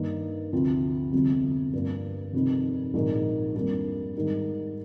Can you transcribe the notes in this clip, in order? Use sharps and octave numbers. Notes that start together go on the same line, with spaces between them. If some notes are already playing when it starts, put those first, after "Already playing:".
Already playing: G2 D#3 A#3
D2 C3 F3 C4 F4
G1 F2 C3 F3
G2 F3 A#3
F1 F2 D#3
A#1 G#2 D#3
F2 D#3 G3 A#3 D4
G#2 D#3 G3